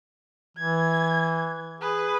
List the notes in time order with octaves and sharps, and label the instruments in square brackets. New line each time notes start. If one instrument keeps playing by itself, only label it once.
[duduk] E3 [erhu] G#6
[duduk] G#4 [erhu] B4